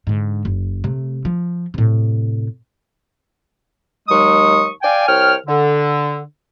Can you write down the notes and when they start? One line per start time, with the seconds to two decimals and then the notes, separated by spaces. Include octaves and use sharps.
0.07 G#2 D3
0.45 F#1
0.84 C3 A3
1.25 F3
1.74 A2 C3
4.09 D#2 F#3 G#3 C#6 D#6
4.83 D5 F5 G5 G#5
5.08 C2 C#5 G5 F6
5.47 D3